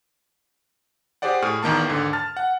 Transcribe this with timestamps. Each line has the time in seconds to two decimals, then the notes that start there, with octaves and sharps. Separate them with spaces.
1.22 G4 G#4 C5 D5 F#5
1.42 A2 G#4 C#6 F6
1.63 E2 D#3 A#3 A5
1.88 D#2 G#2 D3
2.13 A5 F6 A6
2.37 F#5